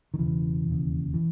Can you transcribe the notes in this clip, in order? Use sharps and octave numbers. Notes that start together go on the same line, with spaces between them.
D#3
E1 D#2 C#3 E3
E1 D#2 C#3
E3